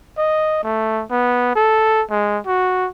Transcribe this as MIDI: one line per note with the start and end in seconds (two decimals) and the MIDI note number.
0.18 0.63 75
0.63 1.03 57
1.11 1.54 59
1.55 2.03 69
2.10 2.39 56
2.46 2.88 66